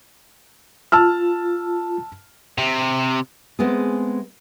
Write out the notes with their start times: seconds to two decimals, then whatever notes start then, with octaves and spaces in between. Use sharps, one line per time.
0.92 F4 A5 E6 F6
2.58 C3
3.59 G#3 A3 B3 C4 G#4